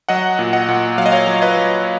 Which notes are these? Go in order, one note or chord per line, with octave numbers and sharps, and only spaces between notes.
F#3 D#5 F#5
A#2
D#5 F#5
A#2
F#3 F5
D#5
C#5 F5
F#3
B4 D#5
F#3